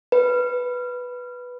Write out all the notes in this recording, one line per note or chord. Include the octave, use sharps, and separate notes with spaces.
B4